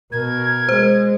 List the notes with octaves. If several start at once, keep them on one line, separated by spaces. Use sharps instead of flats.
B2 A#4 G#6
G#3 C5